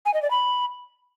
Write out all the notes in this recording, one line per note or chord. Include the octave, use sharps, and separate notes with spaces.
G#5
D#5
D5
B5